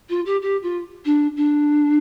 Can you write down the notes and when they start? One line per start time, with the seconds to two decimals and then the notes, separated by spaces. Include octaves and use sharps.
0.09 F4
0.25 G4
0.41 G4
0.62 F4
1.04 D4
1.36 D4